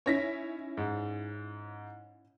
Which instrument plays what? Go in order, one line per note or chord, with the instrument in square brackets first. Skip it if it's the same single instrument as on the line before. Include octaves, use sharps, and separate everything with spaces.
[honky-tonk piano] C#4 D#4 E4 [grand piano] C#5 A#6 B6
[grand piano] G#2